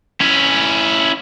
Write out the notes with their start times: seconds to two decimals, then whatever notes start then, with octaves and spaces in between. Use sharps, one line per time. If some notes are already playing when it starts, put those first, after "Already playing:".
0.21 C#4 E4